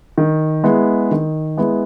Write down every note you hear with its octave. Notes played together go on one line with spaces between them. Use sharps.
D#3
G#3 B3 E4
D#3
G#3 B3 E4